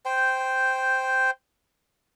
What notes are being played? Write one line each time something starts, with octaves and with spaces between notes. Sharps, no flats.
C5 G5